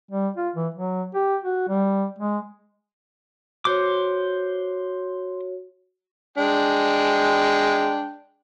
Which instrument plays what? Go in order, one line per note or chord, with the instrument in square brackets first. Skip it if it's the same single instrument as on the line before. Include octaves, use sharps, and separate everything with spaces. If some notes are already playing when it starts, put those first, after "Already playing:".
[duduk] G3
F4
E3
F#3
G4
F#4
G3
G#3
[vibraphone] F#4 C#5 [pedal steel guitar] C5 D6
[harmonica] G#3 D4 G5